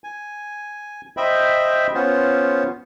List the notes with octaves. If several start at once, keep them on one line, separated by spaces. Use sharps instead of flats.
G#5
C5 D#5 E5 G5 B5
B3 C#4 F4 C5